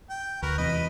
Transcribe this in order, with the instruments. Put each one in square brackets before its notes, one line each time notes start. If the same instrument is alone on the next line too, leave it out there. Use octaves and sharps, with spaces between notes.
[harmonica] G5
[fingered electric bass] D2 [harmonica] F#4 A#4 B4
[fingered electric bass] E2 C3 E3 [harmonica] B4 D#5 B5